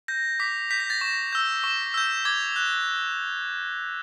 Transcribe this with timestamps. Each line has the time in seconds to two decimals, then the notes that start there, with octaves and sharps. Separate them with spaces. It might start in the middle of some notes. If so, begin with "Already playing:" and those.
0.08 G6 A#6
0.40 D6 B6
0.71 G6 B6
0.80 A#6
0.90 A6
1.01 C#6 A#6
1.33 E6 G6
1.64 C#6
1.94 E6 G6
2.25 D6 G#6
2.56 F#6